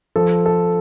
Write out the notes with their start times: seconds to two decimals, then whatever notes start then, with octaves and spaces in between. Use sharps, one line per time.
0.16 F3 A4
0.46 A4